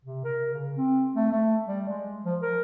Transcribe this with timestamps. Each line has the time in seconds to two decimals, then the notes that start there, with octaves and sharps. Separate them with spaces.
0.05 C3
0.24 A#4
0.53 C#3
0.77 C4
1.15 A3
1.32 A3
1.67 G3
1.89 G#3
2.25 F3
2.42 A#4